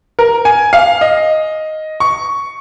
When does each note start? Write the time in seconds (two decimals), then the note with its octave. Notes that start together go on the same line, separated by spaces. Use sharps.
0.19 A#4
0.45 G#5
0.73 F5
1.01 D#5
2.00 C#6